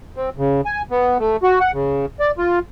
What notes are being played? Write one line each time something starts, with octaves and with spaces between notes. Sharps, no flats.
C4
C#3
G#5
B3
A3
F#4
F#5
C#3
D5
F4